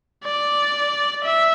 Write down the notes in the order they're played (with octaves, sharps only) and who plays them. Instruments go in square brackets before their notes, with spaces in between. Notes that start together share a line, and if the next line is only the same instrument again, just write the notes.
[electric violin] D5
E5